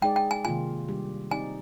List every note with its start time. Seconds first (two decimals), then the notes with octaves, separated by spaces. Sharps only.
0.02 G#3 D#4 G#4 D5 G5
0.16 G5
0.31 G#5
0.45 C3 D#3 A#3 F4 G#5
0.88 G3 D4 G4
1.31 C4 D#4 G4 D5 G#5